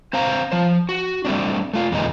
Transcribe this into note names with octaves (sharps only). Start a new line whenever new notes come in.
C4 C5 F5 A#5
F3 C5
F#4
G3 A3 C4 D4
A3 F4
E2 A#2 D3 D#3 G#3 D#4